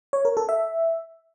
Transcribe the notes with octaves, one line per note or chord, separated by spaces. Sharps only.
C#5
A#4
A4
E5